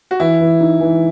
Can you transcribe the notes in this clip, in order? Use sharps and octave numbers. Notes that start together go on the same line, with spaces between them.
F#4
E3 E4
E3
D#4
E3